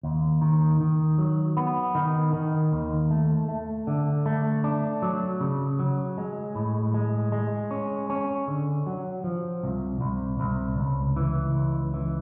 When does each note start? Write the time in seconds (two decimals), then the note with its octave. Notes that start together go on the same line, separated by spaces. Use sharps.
0.03 D#2
0.41 D#3
0.81 D#3
1.18 F#3
1.57 B3
1.95 D#3
2.33 D#3
2.72 D#2
3.10 A3
3.48 A3
3.87 D3
4.26 A3
4.64 D4
5.02 F#3
5.41 C#3
5.79 F#3
6.18 G#3
6.55 A2
6.94 G#3
7.32 G#3
7.71 C#4
8.10 C#4
8.48 D3
8.87 F#3
9.24 F3
9.63 C2
10.01 C2
10.40 C2
10.78 C#2
11.16 E3
11.55 C#2
11.94 E3